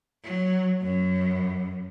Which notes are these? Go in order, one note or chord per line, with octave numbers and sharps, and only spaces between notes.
F#3
F#2